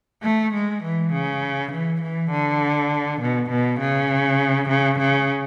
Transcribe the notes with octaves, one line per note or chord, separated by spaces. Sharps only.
A3
G#3
E3
C#3
E3
E3
D3
B2
B2
C#3
C#3
C#3